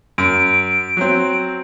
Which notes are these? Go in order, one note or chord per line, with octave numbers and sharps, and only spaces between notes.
F#2 D7
F#3 C4